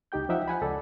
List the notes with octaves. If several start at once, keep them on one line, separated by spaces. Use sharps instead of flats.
C#2 D#4 G4 G5 G6
F3 D#4 E5 F#5 G5
F#5 G#5 B5
C#2 A4 D5